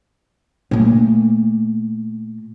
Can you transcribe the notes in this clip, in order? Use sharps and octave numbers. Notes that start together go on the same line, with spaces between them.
A#2 A3